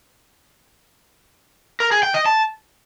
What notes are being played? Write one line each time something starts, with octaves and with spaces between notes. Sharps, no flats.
A#4
G#4
G5
D#5
A5